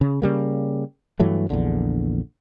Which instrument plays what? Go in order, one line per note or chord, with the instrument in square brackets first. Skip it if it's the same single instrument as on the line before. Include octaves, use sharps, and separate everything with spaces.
[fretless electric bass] C#3
C#3 G3 A#3
G2 E3 F#3 A3
A#1 E2 D3